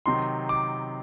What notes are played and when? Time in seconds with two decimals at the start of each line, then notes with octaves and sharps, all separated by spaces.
0.06 C3 D#3 F#3 C6
0.49 D6